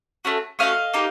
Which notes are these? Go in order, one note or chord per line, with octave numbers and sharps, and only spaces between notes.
A3 C#4 F#4
A3 C#4 F#4 D#5 F5
A#3 D#4 G4